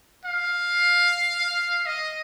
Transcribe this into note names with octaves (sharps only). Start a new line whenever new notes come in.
F5
D#5